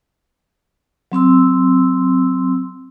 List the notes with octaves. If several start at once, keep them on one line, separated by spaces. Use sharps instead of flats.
F#3 C4 C6 E6